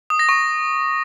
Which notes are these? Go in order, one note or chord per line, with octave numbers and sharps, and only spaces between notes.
D#6
A#6
C#6